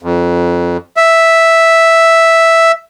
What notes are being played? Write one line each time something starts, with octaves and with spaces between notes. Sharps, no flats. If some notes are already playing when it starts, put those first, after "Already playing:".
F2
E5